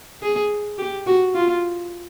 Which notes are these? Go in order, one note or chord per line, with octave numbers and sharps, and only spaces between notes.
G#4
G4
F#4
F4